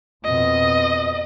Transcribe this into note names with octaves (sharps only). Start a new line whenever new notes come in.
F2 B2 D#5